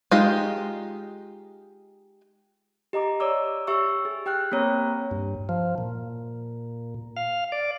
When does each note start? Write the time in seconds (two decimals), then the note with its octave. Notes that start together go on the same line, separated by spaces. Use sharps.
0.11 G#3 D#4 F4 G4
2.93 G4 D#5 A#5 D6
3.20 C#5 D5 D6 E6
3.67 G4 E5 C#6 E6
4.05 G#4
4.26 G4 G5 F6 F#6
4.52 A#3 C4 C#5 A#5
5.11 G2
5.49 F3
5.78 A#2
7.17 F5
7.52 D5